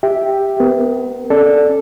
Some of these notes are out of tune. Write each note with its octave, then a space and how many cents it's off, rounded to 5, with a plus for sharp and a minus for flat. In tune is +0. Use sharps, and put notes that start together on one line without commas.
G4 +5 E5 +0 G5 +0
B3 +35 A#4 +10
C#4 +0 A4 +0 D5 +0